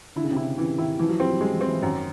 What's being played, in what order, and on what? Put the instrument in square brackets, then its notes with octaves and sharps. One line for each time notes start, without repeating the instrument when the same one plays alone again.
[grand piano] D3 [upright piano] E4
[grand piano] C#3
C3
[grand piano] C#3 [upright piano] E4
[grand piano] C#3 [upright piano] E3
[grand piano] D#3 [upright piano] E4
[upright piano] E3 [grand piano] F3
[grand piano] F#3
[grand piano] G3 [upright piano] C4
[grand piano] F#3
[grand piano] G3 [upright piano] G#3
[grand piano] F3
[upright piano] C4
[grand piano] E3
[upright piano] F#2 [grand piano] D#3